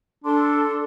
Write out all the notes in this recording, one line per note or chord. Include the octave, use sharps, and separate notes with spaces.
D4 A4 C6